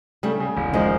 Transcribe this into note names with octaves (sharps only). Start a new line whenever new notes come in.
C#3 G3 A3
C#3
E1
D#3 F3 G#3